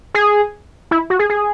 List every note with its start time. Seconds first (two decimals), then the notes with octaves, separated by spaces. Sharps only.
0.14 G#4
0.91 E4
1.10 F#4
1.19 G#4
1.29 G#4